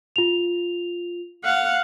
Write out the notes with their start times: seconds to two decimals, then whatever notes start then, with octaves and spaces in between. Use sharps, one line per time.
0.16 F4 F7
1.44 F5 F#5